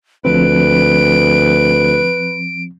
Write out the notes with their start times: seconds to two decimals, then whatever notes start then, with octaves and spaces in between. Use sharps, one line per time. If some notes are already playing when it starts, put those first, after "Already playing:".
0.25 D2 F3 C4 B4 D7